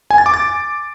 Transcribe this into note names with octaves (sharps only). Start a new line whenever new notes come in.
G#5
A6
D6
A6